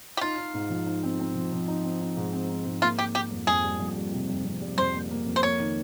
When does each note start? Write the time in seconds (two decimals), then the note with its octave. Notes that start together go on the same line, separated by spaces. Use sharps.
0.17 G4
0.21 D#4 F4
0.38 D#4
0.54 G#2
0.70 F3
0.86 D#4
1.03 C4
1.19 C4
1.35 F3
1.52 F3
1.68 D#4
1.84 C4
2.01 D#4
2.17 G#2
2.33 C4
2.50 D#4
2.65 G#2
2.82 A#3 F4
2.99 A#3 G4
3.15 A#3 G4
3.31 F2
3.47 F2 G#4
3.64 G3
3.80 F2
3.97 G3
4.13 C3
4.30 F2
4.45 F2
4.61 G3
4.78 F2 C5
4.94 A#3
5.11 A#3
5.27 F2
5.36 C5
5.43 A#3 C#5
5.59 D#3